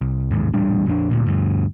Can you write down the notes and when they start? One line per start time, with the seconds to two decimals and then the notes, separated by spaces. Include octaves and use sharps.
0.01 C2
0.31 A1 D#2 G#2
0.54 D#1 A1 G3 D4
0.86 A#1 F2 C4 D4
1.11 D2 A#2
1.25 G1 D2 G2